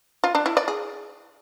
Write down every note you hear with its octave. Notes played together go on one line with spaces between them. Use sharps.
F4
D4
E4
D5
G#4